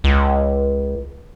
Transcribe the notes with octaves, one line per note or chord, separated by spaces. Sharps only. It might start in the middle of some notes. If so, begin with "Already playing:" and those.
C#2